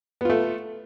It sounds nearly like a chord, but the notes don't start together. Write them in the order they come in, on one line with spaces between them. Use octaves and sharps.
B3 F4 A3